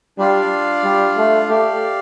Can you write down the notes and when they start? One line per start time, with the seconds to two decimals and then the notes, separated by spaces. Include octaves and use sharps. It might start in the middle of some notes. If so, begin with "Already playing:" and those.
0.18 G3 D4 F4 D5 F5
0.84 G3
1.17 A3
1.50 A3 G4 D5 F5